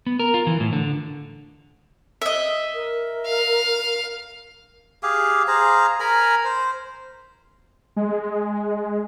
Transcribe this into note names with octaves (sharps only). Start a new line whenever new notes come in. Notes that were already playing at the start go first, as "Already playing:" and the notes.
B3
A#4
F4
E3
A2
D3
D#5 E5
A#4
F5
G4 G#4 F5
G#4 C5 F5 A#5
A#4 G#5 A#5 B5
C5
G#3